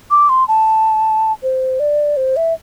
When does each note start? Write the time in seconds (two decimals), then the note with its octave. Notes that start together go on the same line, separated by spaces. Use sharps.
0.11 D6
0.29 C6
0.48 A5
1.43 C5
1.80 D5
2.17 C5
2.37 E5